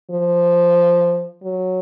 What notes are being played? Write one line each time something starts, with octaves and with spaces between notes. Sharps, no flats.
F3
F#3